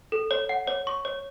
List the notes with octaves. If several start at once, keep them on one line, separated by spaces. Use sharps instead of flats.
A4
C#5
F#5
C#5
C#6
C#5